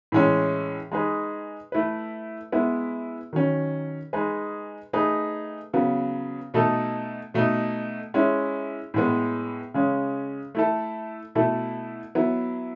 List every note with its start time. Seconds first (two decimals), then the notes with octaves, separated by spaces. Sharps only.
0.12 A2 E3 G#3 C#4
0.92 G#3 D#4 G#4 B4
1.72 A3 E4 B4
2.52 G#3 B3 E4
3.33 D#3 F#3 C#4
4.13 G#3 D#4 G#4 B4
4.93 A3 D#4 G#4 B4
5.74 C#3 F#3 B3
6.54 B2 A3 D#4 A4
7.34 B2 A3 D#4
8.14 G#3 C#4 E4
8.94 A2 G#3 B3
9.74 C#3 G#3 C#4
10.55 A3 E4 A4
11.35 B2 A3 E4 A4
12.15 F#3 B3 E4